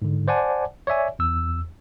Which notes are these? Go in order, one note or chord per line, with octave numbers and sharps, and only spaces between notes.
G#2 D3
C5 D5 F#5 G#5 A5
C#5 D5 E5 G#5
E2 E6